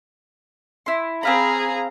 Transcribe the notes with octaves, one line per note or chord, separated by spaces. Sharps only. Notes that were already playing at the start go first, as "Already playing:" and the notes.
E4 C6
C4 G#4 F5 A#5 B5